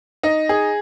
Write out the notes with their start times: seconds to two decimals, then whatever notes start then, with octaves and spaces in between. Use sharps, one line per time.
0.23 D#4
0.49 G#4